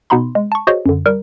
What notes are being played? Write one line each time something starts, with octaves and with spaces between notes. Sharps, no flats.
B2 B3 D#4 B5 C6
G#3
A5 C#6
F#4 G#4 C5 C#5 D#5
F#2 D3
G3 A#4